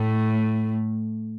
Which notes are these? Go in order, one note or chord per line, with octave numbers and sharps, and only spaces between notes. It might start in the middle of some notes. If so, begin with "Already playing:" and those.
Already playing: A2 A3